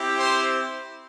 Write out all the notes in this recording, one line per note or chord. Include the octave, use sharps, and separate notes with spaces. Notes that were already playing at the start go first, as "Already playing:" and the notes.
Already playing: C4 E4 G4
C5 C6